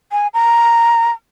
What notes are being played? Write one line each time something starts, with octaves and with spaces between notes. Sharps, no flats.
G#5
A#5